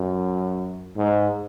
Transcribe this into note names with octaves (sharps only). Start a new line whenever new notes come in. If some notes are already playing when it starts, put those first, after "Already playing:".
Already playing: F#2
G#2